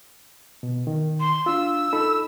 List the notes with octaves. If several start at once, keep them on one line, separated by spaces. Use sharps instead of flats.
B2
D#3
C6
D4 F4 E6
D#4 A4 B5